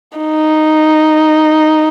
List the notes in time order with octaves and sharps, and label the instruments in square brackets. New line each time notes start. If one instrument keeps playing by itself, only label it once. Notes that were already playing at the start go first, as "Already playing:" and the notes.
[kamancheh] D#4